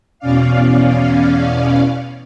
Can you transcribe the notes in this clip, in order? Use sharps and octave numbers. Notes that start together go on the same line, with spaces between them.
E2 B2 C#4 D5 F5